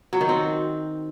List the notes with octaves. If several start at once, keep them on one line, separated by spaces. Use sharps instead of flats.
F#3
D#3
C4